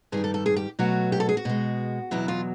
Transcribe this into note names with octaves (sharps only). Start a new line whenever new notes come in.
G2 D#3 G3 G#4
A4
A4
G#4
G4
B2 F#3 A3 F#4
G4
A4
G#4
F#4
B2 G#3
E2 B2 F#3 E4
F4